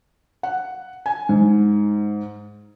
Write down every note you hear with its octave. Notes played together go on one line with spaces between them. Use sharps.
F#5
G#5
G#2